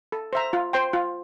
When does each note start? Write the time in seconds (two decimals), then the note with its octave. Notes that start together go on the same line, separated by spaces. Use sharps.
0.12 A4
0.33 C5 E5 A#5
0.53 F4
0.73 C5 G5 C6
0.93 F4